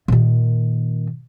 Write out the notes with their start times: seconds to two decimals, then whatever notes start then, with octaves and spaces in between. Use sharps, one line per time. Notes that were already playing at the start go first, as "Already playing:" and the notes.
0.08 A#2 D#3